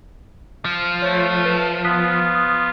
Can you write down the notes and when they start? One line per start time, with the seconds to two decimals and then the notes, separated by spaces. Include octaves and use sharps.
0.65 F3
1.02 A3 C#5
1.45 B4
1.84 B3 F4 D#6 F#6 B6
2.35 D#6